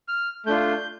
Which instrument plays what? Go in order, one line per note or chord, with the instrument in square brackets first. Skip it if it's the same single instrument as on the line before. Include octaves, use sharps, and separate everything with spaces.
[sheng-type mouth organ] F6
A3 D4 F4 G6